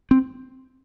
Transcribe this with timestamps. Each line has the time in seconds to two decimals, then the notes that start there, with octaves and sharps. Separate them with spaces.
0.11 C4